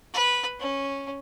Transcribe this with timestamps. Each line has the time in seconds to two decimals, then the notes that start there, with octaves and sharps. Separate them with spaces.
0.14 B4
0.60 C#4